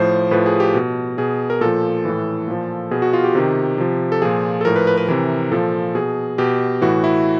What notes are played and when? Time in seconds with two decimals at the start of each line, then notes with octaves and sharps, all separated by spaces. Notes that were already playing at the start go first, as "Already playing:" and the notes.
Already playing: A2 F3 C5
0.31 A2 F3 B4
0.46 G#4
0.60 G4
0.74 B2
1.18 B2 G#4
1.50 A#4
1.61 A#2 F3 A4
2.05 A2 E3
2.48 A#2 F3
2.91 B2 G#4
3.02 F#4
3.13 F4
3.24 G4
3.35 C3 D#3
3.78 C3 F3
4.12 A4
4.22 A#2 F3 G#4
4.61 A4
4.65 A2 F3 A#4
4.76 B4
4.87 B4
4.97 B4
5.08 C3 E3 A#4
5.52 A#2 F3 A4
5.95 B2 G#4
6.38 B2 G4
6.82 A2 E3 F#4
7.04 E4